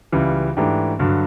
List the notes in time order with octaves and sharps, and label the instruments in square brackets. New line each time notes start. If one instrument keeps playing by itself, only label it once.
[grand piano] C#2 C#3 E3 G3
G#2 E3 A3 D4 G4
G2 D3 F#3